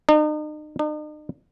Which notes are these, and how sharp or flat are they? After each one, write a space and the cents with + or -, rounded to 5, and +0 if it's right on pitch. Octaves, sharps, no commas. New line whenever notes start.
D#4 -40
D#4 -45